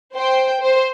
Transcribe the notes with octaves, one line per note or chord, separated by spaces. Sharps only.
C5 G5
C5